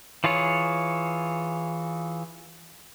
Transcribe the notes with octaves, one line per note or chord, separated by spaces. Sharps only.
E3 F4 G#4 C#5